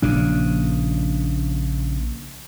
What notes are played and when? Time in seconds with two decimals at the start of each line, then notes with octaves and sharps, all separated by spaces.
0.02 A#1 C#3 D4